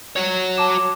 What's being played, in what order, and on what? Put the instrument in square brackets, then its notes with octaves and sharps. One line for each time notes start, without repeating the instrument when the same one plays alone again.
[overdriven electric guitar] F#4 C#5
[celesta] A5 D6 E7